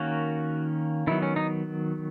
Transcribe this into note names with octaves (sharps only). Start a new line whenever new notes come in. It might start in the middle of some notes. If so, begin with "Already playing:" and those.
Already playing: D#3 A#3 C#4 F#4
D#3 F#3 B3 E4
C#4
D#4